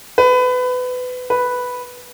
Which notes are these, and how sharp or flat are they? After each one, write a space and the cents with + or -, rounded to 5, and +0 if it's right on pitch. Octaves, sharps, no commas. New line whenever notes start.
B4 +25
B4 +0